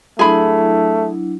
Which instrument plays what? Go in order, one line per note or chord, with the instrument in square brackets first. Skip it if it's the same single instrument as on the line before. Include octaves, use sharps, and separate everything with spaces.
[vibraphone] F#3 D4 E4 [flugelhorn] A3 [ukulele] G#4 B5